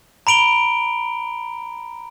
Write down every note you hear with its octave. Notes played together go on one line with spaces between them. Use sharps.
A#5 B5 D7 F7 G7